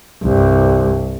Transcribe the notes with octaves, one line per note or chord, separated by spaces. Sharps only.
C2 G2